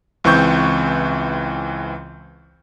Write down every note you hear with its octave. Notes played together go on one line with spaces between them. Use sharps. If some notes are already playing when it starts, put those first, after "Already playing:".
C#2 E3 C4 C#6 G6